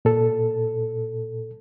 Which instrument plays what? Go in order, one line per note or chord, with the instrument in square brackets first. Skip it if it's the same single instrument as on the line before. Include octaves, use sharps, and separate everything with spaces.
[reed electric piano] A#2 A4